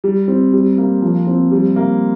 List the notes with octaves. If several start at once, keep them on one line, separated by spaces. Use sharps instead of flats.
G3
C4
G3
A#3
F3
C4
G3
A#3